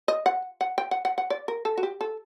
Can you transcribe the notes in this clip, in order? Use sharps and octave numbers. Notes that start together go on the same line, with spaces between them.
D#5
F#5
F#5
G5
F#5
F#5
F#5
D5
A#4
A4
F#4
G4
A4